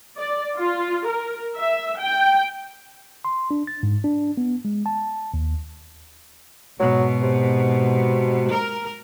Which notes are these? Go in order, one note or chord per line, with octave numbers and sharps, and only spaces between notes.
D5
F4
A#4
E5
G5
C6
D4
A6
G#2
D4
B3
G#3
A5
D#2
G#2 B2 F#3
C3
A#4